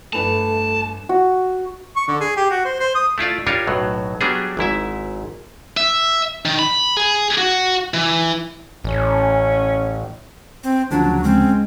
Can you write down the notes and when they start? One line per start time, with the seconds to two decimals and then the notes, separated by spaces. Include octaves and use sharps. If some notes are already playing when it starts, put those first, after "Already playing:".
0.13 G1 A3 B4 A5 F7
1.09 F#4
1.96 C#6
2.08 D3
2.20 G#4
2.37 G4
2.50 F#4
2.65 C5
2.80 C5
2.95 D#6
3.18 A3 E4 F4 D5
3.47 G3 D4 F4 A#4 C#5
3.67 B1 A2 F#3
4.21 F#3 G3 B3 D4 G#4
4.57 G#1 G#2 E4 E5
5.77 E5
6.46 D#3
6.59 B5
6.97 G#4
7.38 F#4
7.94 E3
8.84 A1 C#4
10.64 C4
10.91 D2 C#3 F3 F#3 D4
11.24 G#3 C4 C#4